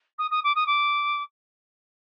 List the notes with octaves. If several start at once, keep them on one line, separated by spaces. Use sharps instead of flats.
D#6
D#6
D6
D#6
D6